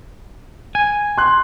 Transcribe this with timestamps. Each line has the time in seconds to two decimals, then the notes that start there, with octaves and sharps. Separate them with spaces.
0.75 G#5
1.18 C6 F#6